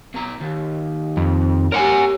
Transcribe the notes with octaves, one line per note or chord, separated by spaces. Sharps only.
B2 A#5
D#2
F2
G4 A#4 C#5 F#5 G#5